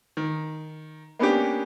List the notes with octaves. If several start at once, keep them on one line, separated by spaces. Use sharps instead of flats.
D#3
A#3 B3 C#4 D4 G4